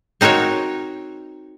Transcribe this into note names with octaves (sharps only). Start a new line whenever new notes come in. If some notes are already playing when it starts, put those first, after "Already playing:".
C4 D#4 F#4 A#4 C#5